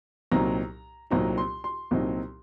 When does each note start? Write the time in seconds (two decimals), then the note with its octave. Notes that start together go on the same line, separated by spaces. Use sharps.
0.31 C2 A#2 F#3 C4 D#4 A#5
1.10 C2 A#2 F#3 C4 D#4 A#5
1.38 C6
1.64 C6
1.91 C2 A#2 F#3 C4 D#4